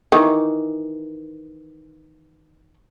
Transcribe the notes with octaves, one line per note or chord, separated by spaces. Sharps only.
D#3 E3